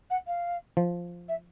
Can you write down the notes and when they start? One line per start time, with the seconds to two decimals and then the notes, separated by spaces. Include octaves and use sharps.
0.10 F#5
0.27 F5
0.77 F3
1.28 E5